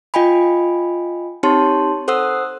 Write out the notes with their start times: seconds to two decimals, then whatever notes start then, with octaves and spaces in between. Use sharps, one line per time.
0.14 F4 D#5 G5 G#5 B5
1.43 C4 D#4 G4 C#5 A5 C6
2.08 A4 C5 F#5 D#6 E6 F#6